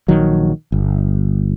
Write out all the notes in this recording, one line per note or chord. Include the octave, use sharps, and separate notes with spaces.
A#1 D#3 F#3
G1